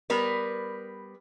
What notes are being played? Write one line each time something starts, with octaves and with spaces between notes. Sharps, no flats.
G3 B3 A#4 B4